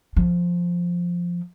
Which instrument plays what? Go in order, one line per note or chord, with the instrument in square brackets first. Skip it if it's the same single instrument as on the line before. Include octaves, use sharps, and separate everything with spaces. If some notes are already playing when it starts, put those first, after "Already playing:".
[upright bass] F3